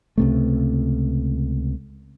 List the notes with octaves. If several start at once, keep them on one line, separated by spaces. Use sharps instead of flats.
C#2 C3 A3